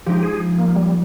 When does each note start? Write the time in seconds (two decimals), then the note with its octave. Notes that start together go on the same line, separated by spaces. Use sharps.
0.06 F3 G#3 D#4 G4
0.23 G#4
0.58 A#3
0.76 G3